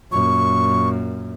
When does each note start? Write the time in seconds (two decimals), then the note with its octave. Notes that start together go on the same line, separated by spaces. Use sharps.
0.12 F#2 A#2 C#6